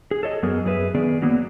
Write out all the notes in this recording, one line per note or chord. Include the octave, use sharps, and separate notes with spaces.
G#4
A4 C#5 D#5
F#2 F#3 B3 G#4 A#4
F#2 G#4 B4 E5
D#3 B3 G#4 D5
F#3 A#3 B3